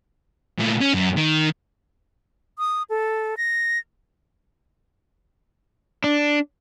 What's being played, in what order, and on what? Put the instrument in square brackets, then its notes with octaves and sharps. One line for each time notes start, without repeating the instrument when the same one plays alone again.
[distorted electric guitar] A#2 A3
C#4
F#2
D#3
[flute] D#6
A4
A#6
[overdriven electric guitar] D4